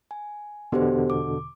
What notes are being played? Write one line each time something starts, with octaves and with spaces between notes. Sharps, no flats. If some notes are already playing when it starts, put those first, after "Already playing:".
G#5
E2 B2 D3 B3 G4 C5
D6